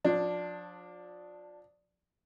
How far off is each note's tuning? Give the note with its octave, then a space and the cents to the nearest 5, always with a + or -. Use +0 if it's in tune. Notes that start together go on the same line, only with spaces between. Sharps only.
F3 +35 D4 +0